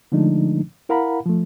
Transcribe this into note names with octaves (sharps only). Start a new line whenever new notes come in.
D3 F3 G#3 A3 D4 D#4
E4 A#4 F5 F#5 A#5 B5
F3 A3